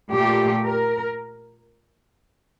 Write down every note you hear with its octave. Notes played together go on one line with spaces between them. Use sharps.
A#2 A3 G4
A#4